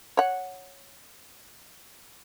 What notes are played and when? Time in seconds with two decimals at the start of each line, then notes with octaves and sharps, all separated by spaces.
0.17 C#5 F#5